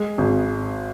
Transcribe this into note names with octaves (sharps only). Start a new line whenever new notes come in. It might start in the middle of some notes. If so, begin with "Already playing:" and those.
Already playing: G#3
G#1